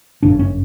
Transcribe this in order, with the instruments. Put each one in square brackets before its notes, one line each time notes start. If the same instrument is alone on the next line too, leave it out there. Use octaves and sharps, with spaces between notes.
[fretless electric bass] G1 F#2 C#3 D4
C#4